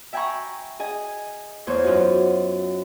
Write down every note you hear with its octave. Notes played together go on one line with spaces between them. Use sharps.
E5 G5 G#5 A#5 B5 C#6
G#4 D#5 G#5
E2 B3 C5 C#5
F#2 D#4 F4 F#4